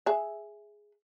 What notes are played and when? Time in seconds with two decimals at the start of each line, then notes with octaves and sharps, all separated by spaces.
0.06 G#4 E5